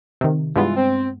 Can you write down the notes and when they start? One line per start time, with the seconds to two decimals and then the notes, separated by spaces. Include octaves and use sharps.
0.21 C3 D#3
0.56 G2 E3 G#3 B3 F4
0.76 C4